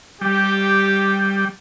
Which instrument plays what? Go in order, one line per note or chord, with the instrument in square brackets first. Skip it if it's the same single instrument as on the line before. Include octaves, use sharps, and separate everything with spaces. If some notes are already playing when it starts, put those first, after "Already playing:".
[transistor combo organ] G3 [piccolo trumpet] G4